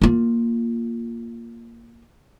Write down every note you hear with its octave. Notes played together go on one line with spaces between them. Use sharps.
A#3 F4